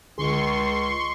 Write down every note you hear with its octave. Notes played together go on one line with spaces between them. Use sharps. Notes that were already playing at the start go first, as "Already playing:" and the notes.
C#2 D3 G#4 C6 C#6